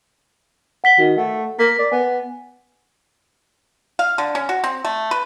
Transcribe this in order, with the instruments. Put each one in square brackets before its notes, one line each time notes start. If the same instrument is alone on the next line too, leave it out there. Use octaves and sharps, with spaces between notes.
[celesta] F#5 B6 G7
[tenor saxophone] D#3 [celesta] F#4
[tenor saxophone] A3 [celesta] F#5
[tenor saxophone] A#3 [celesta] B6
[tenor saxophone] D5
[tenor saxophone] B3 [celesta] G#5
[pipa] F5
D3
C#4
F#4
C4
A3
B4